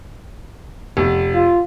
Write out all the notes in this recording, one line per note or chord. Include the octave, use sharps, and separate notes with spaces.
F1
F4